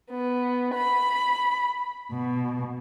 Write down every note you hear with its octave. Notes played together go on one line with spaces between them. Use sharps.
B3
B5
B2